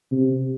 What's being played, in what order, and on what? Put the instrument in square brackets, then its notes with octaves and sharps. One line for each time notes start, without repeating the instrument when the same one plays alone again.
[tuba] C3